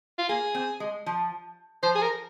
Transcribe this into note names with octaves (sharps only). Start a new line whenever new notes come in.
F4
A#3 G#4
C4
G#3
F3
F3 C5
G#4
A#4